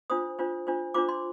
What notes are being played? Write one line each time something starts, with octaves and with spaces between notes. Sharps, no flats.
D4 F4 C5 D#6
D4 F4 C5
D4 F4 C5
D4 F4 C5 D6
C6